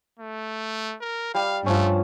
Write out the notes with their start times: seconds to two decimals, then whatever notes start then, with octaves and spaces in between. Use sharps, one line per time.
0.19 A3
1.01 A#4
1.34 G3 F5
1.66 G2 F3 A3 C#4